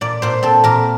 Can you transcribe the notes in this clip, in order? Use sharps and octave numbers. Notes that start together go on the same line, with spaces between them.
A#2 D5
A#2 C5
C4 A4
A#2 A#4